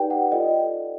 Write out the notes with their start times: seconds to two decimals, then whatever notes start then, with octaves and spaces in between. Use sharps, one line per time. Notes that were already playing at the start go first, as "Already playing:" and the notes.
Already playing: D#4 G4 B4 D5 G5
0.10 F#5
0.31 F4 A4 D5 D#5